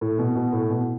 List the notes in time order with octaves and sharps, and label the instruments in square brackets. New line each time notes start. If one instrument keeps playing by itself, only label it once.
[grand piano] A2
B2
B2
A2
B2